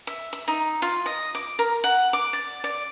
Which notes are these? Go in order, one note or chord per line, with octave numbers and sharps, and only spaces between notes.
E5
E5
D#4
F4
D#5
D6
A#4
F#5
D6
D5
D5